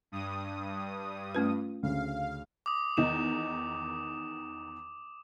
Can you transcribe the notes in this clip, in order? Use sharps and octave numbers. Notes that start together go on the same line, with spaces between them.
G2 D#6
A3 C#4 F4 B4
D2 C#3 F5
D6 D#6
E2 D#3 D#4 E7